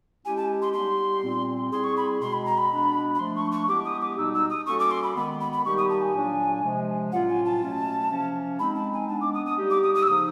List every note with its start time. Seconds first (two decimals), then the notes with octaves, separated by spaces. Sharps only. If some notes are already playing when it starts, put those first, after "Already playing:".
0.25 G#3 C#4 E4 G4 G#5
0.37 A5
0.62 C6
0.73 G3 B3 D#4 G4 C6
1.23 A#2 G3 C4
1.72 G3 C4 E4 G#4 C6
1.84 C#6
1.96 B5
2.21 B2 G#3 C4 C6
2.33 B5
2.45 A#5
2.57 B5
2.70 B2 G#3 B3 D4
3.14 B5
3.19 F3 A3 D4 C6
3.35 C#6
3.51 C#6
3.68 G#3 B3 E4 G4 D6
3.85 D#6
4.01 D6
4.18 B2 G3 B3 D#4 E6
4.34 E6
4.49 D#6
4.66 G3 A#3 C#4 F#4 A4 C#6
4.79 D6
4.91 C6
5.03 B5
5.16 D#3 G#3 B3 B5
5.40 B5
5.52 B5
5.64 D#3 G3 A#3 D#4 G4 C#6
5.77 D#6
5.89 A5
6.01 G#5
6.14 A#2 F#3 A#3 D4
6.63 C3 F3 G#3
7.12 A2 F#3 A#3 C#4 F4 F#5
7.29 G#5
7.45 A5
7.62 B2 F#3 A3 C#4
8.10 C3 F3 A#3 C#4
8.59 G#3 C4 D#4 B5
8.75 A5
8.93 G#5
9.08 G#3 B3 D4 A5
9.21 D6
9.34 D#6
9.45 D#6
9.58 G3 A#3 D#4 G4
9.70 D6
9.83 D#6
9.94 D#6
10.02 E6
10.07 C#3 F3 A#3 D#4 D#6